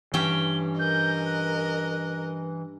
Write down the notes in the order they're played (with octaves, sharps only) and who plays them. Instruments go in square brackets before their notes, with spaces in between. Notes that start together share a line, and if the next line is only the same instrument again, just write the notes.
[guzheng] G2 C#4 G5 [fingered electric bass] E3 [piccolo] G7
[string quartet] A#4 D#5 [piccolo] G6
[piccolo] F#6